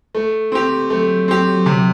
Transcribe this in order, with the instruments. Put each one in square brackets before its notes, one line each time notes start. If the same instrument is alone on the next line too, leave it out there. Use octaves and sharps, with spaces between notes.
[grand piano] A3
C4 G4
[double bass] F#3 [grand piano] A3
[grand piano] C4 G4
C3